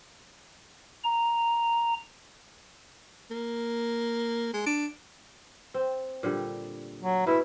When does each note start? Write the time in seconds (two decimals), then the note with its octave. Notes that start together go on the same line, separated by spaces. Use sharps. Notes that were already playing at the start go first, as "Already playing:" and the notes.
1.04 A#5
3.31 A#3
4.54 G#3
4.66 D4
5.74 C4
6.23 A#2 D3 G3
7.03 F#3
7.27 B2 G#3 A3 E4